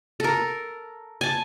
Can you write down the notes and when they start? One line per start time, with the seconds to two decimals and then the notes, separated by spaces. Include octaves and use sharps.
0.20 A4 A#4
1.21 G#5 A5